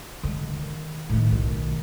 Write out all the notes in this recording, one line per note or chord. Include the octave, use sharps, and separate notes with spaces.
D3 G#3
D#3
A2 D#3
B1 D#3